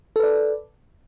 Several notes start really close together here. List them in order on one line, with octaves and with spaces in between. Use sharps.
A4 B4 D5